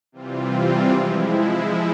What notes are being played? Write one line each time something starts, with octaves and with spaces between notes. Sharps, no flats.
C3 E3 G3 C4 F4
F3 G#3 E4